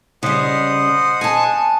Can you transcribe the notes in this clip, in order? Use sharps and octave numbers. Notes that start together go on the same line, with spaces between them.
C#3 G3 C5 D#5 F#5
G#5 A5